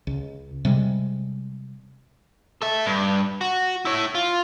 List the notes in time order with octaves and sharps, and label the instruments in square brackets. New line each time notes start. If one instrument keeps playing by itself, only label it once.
[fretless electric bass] C#2
C3 G3 G#3
[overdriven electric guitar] A4 E5
G2
F#4
E4 C#5
F4